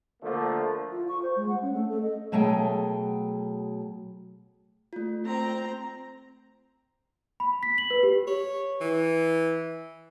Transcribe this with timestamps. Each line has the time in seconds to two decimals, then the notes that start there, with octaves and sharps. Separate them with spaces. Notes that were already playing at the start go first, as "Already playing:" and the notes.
0.22 D3 F3 A3 A#3
0.91 F4
1.08 C#6
1.22 C5
1.36 G#3
1.49 F#5
1.62 C#4
1.73 A3
1.89 A4
2.02 D#5
2.32 B2 F#3 A3 G#4 G5
4.93 A3 F4
5.25 C4 A#5
7.40 B5
7.63 B6
7.78 F#7
7.91 B4
8.03 G4
8.27 C#5
8.81 E3